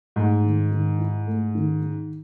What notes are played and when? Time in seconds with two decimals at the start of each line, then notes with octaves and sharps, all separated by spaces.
0.16 G#2 A3
0.44 D#3
0.71 D#3
0.99 E4
1.27 A3
1.55 D#3
1.82 D#3